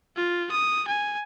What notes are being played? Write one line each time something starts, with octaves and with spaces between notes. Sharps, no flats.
F4
D#6
G#5